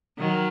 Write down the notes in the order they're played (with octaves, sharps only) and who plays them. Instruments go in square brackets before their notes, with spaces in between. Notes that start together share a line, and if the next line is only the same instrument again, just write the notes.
[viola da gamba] D#3 F#3